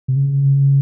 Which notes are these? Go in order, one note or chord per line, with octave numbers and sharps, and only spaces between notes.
C3
C#3